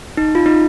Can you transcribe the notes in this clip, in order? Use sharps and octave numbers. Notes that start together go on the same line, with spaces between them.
D#4
F4
D#4